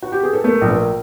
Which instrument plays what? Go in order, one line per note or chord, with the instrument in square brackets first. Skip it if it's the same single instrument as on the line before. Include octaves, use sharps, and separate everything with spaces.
[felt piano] F#4
G4
G#4
A4
[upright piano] A3 [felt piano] A#4
[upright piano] A#1
[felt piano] A#4